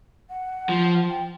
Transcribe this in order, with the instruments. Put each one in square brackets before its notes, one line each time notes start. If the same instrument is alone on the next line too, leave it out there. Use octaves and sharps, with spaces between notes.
[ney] F#5
[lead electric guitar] F3
[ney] G5